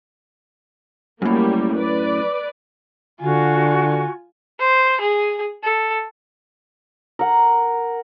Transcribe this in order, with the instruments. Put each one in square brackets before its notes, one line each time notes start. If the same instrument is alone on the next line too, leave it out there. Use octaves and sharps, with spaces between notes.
[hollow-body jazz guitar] F#2 A2 [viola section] G3 A#3
[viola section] B4 D5
[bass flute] D3 [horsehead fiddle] F4 G#5 [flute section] F#4
[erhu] C5
G#4
A4
[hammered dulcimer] A#4 F#5